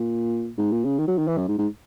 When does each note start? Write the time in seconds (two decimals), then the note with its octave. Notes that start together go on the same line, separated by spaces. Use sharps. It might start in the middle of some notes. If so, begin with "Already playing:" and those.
Already playing: A#2
0.58 G#2
0.72 A#2
0.85 C#3
0.99 D#3
1.08 F#3
1.18 D#3
1.27 E3
1.37 F#2
1.48 G#2
1.58 G#2